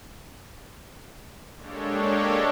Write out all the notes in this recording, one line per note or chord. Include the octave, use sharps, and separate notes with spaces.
G#3 A#3 D4 G4 A4 C#5